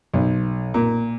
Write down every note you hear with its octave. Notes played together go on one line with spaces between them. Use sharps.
B1
A#2